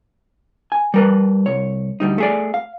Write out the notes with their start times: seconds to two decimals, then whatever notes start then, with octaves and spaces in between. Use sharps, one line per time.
0.72 G#5
0.94 G3 A#4 B4
1.46 C2 C#5
2.00 D2 G3 D#4
2.18 A3 G#4 D5
2.54 F5